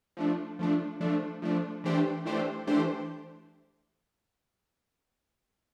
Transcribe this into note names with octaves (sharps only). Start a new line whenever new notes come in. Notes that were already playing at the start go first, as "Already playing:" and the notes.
F3 A3 D4
F3 A3 D4
F3 A3 D4
F3 A3 D4
E3 A3 D4 G4 C5
E3 A3 D4 G4 C5
E3 A3 D4 G4 C5